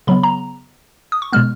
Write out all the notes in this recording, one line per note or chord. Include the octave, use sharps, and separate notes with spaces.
C#3 F#3 B3 B5
A#5
D#6
C#6
B2 G#3 B3 F6